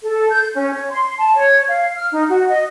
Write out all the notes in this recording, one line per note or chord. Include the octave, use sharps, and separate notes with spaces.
A4
G6
C#4
C#5
C6
A5
C#5
F5
F6
D#4
F#4
D#5